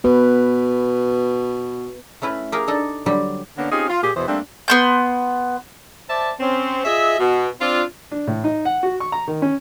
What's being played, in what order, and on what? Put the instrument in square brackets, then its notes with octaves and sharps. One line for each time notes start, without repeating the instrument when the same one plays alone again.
[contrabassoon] B2 [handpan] B3 B4
[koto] A3 C#4 E4 B4
G4 G#4 A#4 F5
D4 D#4 A4
D3 F#3 G3 G4
[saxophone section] D3 A#3 B3 C#4 D4
C4 C#4 D#4 F4 G4 G#4
F4
A#2 G4 G#4
E2 B2 E3 G#4 C5
G3 A3 A#3 C4 D4
[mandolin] B3 C6 G6
[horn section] C5 D5 E5 A5
C4 C#4
F4 G#4 D#5 E5
B2
C4 D4 F4
[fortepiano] D4
A2
D#4
F#5
F#4
C#6
A#5
D#3
C#4